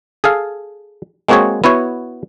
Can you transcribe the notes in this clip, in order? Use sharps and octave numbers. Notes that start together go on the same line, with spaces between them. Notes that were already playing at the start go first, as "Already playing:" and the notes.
G#4 A4 F5
G#3 A#3 C4 F#4 G#4 C#5
B3 E4 F#4 C#5